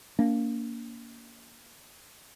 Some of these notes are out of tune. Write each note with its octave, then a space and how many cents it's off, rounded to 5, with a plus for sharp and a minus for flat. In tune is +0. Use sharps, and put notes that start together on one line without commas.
A#3 +0 D4 -45